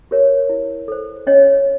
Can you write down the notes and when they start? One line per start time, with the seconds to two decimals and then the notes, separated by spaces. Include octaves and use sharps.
0.11 G4 A#4 C#5
0.49 E4
0.88 A4 C5
1.27 C#4 C#5 D#5